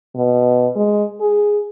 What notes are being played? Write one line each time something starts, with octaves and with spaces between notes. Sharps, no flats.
B2
G#3
G#4